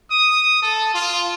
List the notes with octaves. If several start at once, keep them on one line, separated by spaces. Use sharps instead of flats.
D#6
A4
F4